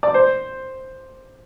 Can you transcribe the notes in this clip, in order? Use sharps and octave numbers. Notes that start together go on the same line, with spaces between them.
D5
C5